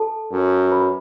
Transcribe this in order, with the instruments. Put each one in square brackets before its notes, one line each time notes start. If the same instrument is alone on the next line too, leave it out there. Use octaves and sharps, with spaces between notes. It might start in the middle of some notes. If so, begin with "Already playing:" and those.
Already playing: [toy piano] A4 A5
[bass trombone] F#2
[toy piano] B4 B5